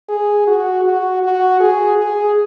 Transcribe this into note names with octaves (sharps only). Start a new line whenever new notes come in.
G#4
F#4
F#4
F#4
G#4
G#4